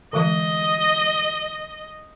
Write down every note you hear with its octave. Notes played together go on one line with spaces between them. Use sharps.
D3 E3 G#3 D#5